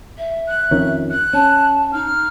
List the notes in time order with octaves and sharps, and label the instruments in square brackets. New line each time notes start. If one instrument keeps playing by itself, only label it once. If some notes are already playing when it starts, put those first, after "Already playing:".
[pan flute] E5
[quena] F#6
[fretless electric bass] F2 D#3 C#4
[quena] F#6
[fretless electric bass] C#4 [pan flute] A5
[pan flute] D#4 [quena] F6